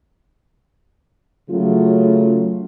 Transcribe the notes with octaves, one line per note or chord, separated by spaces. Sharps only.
C#3 F#3 A3 F4